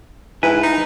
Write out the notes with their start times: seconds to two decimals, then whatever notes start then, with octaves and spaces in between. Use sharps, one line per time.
0.43 G#2 E4 B4 G#5
0.63 D#4